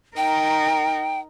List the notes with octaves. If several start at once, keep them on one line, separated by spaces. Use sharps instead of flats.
D#4 A#4 G5